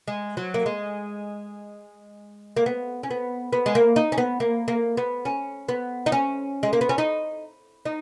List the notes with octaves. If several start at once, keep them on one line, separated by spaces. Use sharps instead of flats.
G#3
F#3
A#3
G#3
A#3
B3
C#4
B3
B3
G#3
A#3
D#4
C#4
B3
A#3
A#3
B3
C#4
B3
D#4
C#4
G#3
A#3
B3
C#4
D#4
D#4